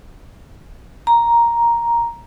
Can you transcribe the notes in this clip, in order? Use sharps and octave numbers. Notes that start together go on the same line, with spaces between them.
A#5